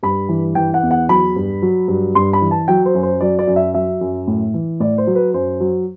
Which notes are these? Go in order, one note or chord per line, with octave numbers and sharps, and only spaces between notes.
G2 B5
E3
E3 G5
F#5
E2
F#5
F#3 B5
G2
F#3
G2
G2 C6
B5
E3
A5
F#3 G5
C5
F#2
C5
F#3 D5
D5
F#2
E5
F#3 E5
F#2
A2
E3
A2 D5
C5
F#3
B4
F#2 C5
F#3